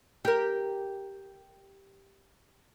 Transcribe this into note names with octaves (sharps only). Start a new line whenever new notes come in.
G4 A#4